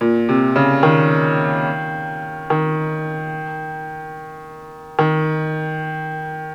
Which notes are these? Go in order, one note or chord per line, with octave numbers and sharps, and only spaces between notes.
A#2
C3
C#3
D#3
D#3
D#3